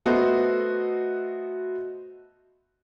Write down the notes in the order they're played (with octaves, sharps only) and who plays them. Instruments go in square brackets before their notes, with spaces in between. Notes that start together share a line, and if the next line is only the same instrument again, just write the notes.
[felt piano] A3 B3 F#4 A4 C5 D#5